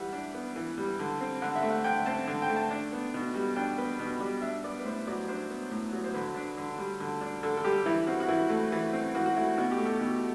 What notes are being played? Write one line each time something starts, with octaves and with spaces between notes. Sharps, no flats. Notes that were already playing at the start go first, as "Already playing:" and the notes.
Already playing: E3 G3 E5 F#5
D4
B3
E3
G3
D3
C4
D3 F#5
E5
A3
F#5
D3 G5
C4 A5
D3
G5
A3
A5
D4
B3
B2
G3
D4 G5
B3 B4
B2
G3 D5
D4 E5
B3 D5
B4
A2 C5
F#3 D5
D4 C5
B3
A2
F#3
C5
D3 B4
D4
D3
G3
D3
D4
D3 A4
A4
G3 G4
E3 E4
C4 F#4
F#4
E3 E4
A3
E3
C4
E3 F#4
F#4
A3 E4
B2 F#4
G4
A3
A4
B2